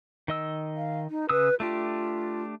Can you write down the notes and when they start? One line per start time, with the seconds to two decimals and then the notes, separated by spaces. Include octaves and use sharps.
0.28 D#3 D#5 E6
0.76 F5
1.10 D#4
1.29 C#3 B4 D#6 E6
1.60 A3 D4 F4 G4